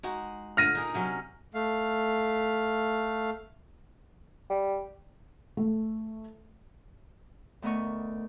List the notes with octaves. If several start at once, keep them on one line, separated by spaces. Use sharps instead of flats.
G#3 D#4 F#4
A#2 D3 F6 A#6 D#7
D#4 G#4 A#4
C3 F#3 C#4
A3 F5
G3
A3
D2 A3 B3 A#4 D#5 C#6